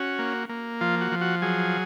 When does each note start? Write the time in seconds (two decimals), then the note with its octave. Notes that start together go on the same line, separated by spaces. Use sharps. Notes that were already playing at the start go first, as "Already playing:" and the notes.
Already playing: C#4 F#4
0.19 A#3
0.49 A#3
0.81 F3 F4
1.01 F#4
1.12 F3
1.21 F#4
1.42 F#3 G#4